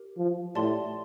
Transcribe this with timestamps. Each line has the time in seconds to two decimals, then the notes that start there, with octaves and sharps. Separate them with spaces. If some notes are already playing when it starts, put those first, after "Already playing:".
Already playing: G4 A#4
0.17 F3
0.55 A2 G4 D5 A5 C6